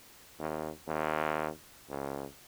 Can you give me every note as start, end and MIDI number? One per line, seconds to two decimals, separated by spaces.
0.39 0.70 39
0.88 1.49 39
1.90 2.25 37